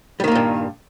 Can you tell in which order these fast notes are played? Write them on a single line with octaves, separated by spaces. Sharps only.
G3 D#3 A#3 A#2 G2